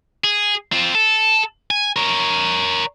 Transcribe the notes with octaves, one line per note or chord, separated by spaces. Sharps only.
G#4
C4 F4
A4
G#5
A#4 C#5